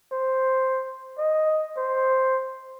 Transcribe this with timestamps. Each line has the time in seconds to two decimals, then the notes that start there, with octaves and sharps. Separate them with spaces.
0.12 C5
1.18 D#5
1.77 C5